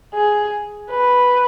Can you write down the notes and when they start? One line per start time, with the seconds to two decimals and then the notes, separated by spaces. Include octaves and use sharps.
0.14 G#4
0.90 B4